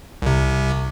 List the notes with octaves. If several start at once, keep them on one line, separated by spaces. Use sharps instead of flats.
C2 C3